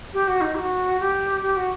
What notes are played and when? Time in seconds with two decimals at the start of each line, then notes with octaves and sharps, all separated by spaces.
0.14 G4
0.28 F#4
0.41 D#4
0.55 G4
0.59 F#4
1.00 G4
1.42 G4
1.56 F#4